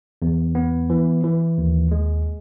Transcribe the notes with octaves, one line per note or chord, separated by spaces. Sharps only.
E2
B3
E3
E3
D#2
G#3